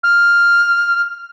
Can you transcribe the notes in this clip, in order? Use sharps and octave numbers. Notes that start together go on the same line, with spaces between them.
F6